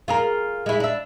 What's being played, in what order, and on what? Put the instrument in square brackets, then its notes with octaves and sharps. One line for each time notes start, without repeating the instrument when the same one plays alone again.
[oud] F4 G#4 A#4
G#3 E4
D4 E5